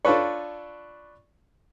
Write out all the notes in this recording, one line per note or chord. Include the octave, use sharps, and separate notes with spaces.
D4 F4 A4 B4 C#5